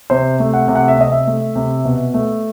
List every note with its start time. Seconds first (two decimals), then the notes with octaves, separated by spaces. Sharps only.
0.10 C3 C5
0.40 A3
0.54 F#5
0.68 C3
0.75 F#5
0.88 E5
0.98 C3 D#5
1.12 E5
1.27 A3
1.56 C3
1.85 B2
2.14 A3